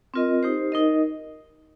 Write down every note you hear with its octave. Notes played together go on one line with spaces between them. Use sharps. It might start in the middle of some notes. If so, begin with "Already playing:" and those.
C4 F4 A#4 D#5
D#4 G4 C5
D#4 A#4 D#5